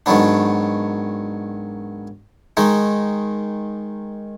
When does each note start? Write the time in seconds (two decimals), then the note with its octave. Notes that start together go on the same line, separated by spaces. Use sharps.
0.06 G#2 D#3 F#3 B3 D4
2.57 D#3 G#3 D#4